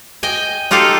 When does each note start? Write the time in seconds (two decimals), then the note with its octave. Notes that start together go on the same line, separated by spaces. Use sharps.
0.23 D#5 G5 G#5
0.71 D#4 F4 G4 A4 F5